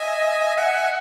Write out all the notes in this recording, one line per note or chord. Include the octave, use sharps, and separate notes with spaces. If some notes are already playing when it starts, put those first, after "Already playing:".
Already playing: D#5 E5 G#5
E5 F#5 G#5